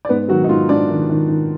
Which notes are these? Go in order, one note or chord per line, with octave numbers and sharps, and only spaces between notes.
D5
G#2 B3 B4
D#3 F#3 F#4
D#4
G#2 F4
G#2 D4 D5
D#3
D#3
D#3